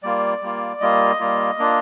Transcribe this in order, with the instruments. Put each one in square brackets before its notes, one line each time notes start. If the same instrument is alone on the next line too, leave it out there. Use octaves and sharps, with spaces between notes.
[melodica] G3 A#3 F4 D5
G3 A#3 F4
G3 A#3 F4 D#5
G3 A#3 F4
A#3 D4 F4